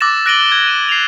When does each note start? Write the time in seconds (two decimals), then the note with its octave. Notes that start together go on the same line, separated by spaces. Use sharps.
0.01 D6 E6 F#6 A6 A#6 E7
0.26 F#6 A#6 D7 D#7 F#7 G7
0.52 G#6
0.68 D#7
0.89 C7 F7